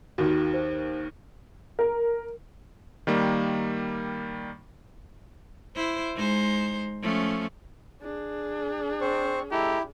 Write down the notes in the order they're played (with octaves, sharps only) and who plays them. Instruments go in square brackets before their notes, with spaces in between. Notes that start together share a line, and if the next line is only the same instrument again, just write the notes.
[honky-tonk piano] D#2 D#3 [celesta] F#4
[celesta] C5
[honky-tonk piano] A#4
[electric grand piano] D#3 G3 A#3
[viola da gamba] E4 C5
G#3 D#4 C5
F3 A3 C#4
[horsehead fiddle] D4 G#4
[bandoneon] C4 C#6 [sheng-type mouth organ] C5
[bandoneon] G#3 A4 A#5 [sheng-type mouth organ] E4 [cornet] G4